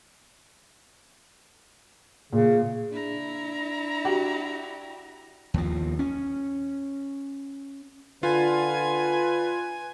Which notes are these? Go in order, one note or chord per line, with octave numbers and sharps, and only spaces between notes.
A#2 C#3
D4 E4 A#5
F#4 G4
D#2 F3
C#4
D3 F4 B4 G#5